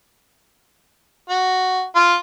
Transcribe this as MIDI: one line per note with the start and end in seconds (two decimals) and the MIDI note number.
1.29 1.83 66
1.95 2.16 65